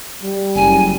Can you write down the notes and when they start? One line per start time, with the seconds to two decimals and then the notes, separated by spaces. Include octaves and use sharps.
0.23 G3
0.55 F#1 G#5